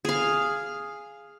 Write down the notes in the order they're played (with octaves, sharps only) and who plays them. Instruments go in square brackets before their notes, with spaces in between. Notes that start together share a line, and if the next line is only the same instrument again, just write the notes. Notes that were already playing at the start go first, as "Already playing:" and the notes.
[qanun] G#4 F5